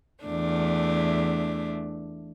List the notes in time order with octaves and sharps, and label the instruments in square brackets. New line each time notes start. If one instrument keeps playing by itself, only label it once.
[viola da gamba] E2 A3 D4